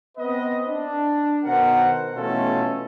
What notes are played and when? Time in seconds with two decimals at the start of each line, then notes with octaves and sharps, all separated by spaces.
0.17 B3 C4 B4 D#5
0.68 D4
1.44 B2 D#3 A#4 C5 F#5
2.14 B2 E3 A3 C#4 F4 A4